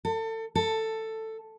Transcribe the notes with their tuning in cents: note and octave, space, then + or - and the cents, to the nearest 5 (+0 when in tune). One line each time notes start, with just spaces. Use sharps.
A4 +30
A4 +10